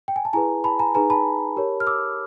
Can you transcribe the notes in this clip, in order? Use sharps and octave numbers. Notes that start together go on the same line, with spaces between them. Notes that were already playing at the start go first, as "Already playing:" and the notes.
G5
G#5
A5
E4 G#4 B4 G#5 A#5
A5 B5
G#5 A#5
D#4 G#4 B4 G#5 A#5
A5 B5
G4 A#4 C#5
F6
D6 E6